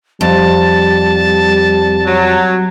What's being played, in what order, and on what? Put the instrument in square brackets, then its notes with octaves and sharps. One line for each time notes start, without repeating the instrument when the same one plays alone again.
[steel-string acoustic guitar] F2 [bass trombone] G3 [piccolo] A5
[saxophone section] F#3